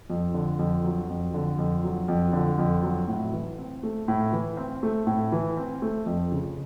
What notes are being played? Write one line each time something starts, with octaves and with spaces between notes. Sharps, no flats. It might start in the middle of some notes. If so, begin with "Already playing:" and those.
F2
D3
F2
F#3
F2
D3
F2
F#3
F2
D3
F2
F#3
A2
E3
C4
A3
A2
E3
C4
A3
A2
E3
C4
A3
F2
C#3